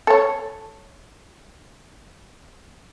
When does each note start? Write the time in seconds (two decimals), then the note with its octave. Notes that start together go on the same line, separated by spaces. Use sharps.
0.07 A4 C#5